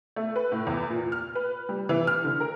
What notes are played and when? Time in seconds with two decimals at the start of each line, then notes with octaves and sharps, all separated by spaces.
0.16 A3
0.36 B4
0.52 A2
0.67 E2
0.90 A#2
1.12 F6
1.35 B4
1.69 G3
1.89 E3
2.07 F6
2.24 D3
2.40 A#4